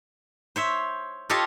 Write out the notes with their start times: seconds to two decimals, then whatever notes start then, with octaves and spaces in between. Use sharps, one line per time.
0.56 C5 C#5 E5
1.30 F4 G4 A4 C#5 D#5 F5